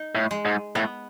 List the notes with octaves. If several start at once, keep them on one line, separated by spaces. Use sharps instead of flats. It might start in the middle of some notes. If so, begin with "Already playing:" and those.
Already playing: D#4
A2
G#3
G#2
A2 B3